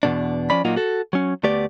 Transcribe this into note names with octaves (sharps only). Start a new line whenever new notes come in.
E2 B2 D4
F3 C#4 D5 B5
A#2 F#3 A#3 D#4 F4 F#4
F#4 A4
F#3 C#4
D2 A3 B3 G4 D5